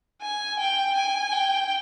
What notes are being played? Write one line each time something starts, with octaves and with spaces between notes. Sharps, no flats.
G#5
G5
G#5
G5